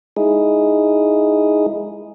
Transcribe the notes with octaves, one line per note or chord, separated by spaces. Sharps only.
G#3 D#4 E4 G#4